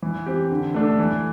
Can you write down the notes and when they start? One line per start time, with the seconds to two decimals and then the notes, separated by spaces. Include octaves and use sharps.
0.02 E3
0.26 C4 G4
0.51 D3
0.74 A3 D4 A4
0.99 E3